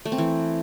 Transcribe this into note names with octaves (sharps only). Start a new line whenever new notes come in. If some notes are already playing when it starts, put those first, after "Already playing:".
A3
C4
E3